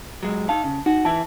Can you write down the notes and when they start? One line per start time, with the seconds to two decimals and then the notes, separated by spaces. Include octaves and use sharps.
0.23 F#3 G#3
0.49 D#4 F5 A5
0.64 C#3
0.86 D#4 F#4
1.05 E3 E4 A5